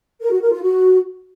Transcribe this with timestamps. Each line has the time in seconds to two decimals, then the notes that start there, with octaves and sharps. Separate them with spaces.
0.22 A#4
0.32 F#4
0.42 A#4
0.52 F4
0.62 F#4